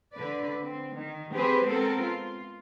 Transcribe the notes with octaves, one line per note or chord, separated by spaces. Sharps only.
D3 B4 D5
C4
D#3
C4 G4 G#4 B4 C5
G#3 B3 C4 A4 A#4
F4